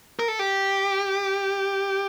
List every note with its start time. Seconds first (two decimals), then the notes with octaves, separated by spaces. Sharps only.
0.19 A#4
0.28 A4
0.39 G4